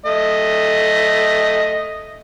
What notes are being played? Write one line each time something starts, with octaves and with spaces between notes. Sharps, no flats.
A3 D#5